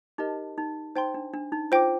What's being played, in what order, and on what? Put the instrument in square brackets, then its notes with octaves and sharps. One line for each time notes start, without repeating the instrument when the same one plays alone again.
[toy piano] D#4 [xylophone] G4 A#4 D#5 A5
[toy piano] D#4
[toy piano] D#4 [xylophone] C5 G5 C6
[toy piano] D4
D4
D#4
[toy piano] F4 [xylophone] C5 G5 D6